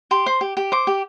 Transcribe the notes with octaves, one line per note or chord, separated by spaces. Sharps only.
G4 C6
C5
G4
G4
C5 D6
G4